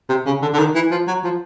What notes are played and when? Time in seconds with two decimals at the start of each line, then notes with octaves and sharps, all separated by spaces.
0.09 C3
0.26 C#3
0.42 D3
0.53 D3
0.59 D#3
0.75 E3
0.91 F3
1.07 F#3
1.24 F3